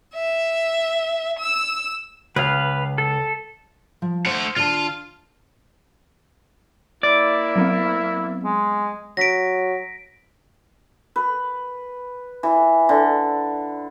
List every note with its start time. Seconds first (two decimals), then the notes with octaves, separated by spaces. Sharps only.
0.15 E5
1.39 E6
2.36 C#2 B4 F5
2.98 A4
4.02 F3
4.26 A3 C5 F#5
4.56 D3 F4 A5
7.03 A#3 E4 D5
7.56 F#3 B3 C4
8.44 G#3
9.17 F#3 A#6 B6 D7
11.16 B4
12.43 E3
12.89 D3